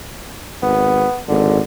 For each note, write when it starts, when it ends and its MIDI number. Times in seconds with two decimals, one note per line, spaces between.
0.62 1.05 32
0.62 1.20 59
1.29 1.59 32
1.29 1.61 50